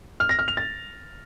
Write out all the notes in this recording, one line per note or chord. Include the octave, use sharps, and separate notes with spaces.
F6
A#6
F6
F7
A6